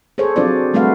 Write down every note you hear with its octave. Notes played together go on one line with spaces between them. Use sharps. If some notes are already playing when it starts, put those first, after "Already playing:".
G#4 A4 C5 C#5
F#3 C4 D4 F4 C5 D5
G3 A3 C4 F#4 B4 F5